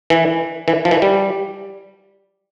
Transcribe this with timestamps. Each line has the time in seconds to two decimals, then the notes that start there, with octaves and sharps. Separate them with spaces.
0.10 E3
0.68 E3
0.85 F3
0.91 E3
1.02 G3